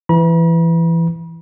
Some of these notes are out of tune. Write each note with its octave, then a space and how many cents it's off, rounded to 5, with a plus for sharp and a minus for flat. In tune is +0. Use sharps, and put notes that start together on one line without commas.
E3 +15 B5 -45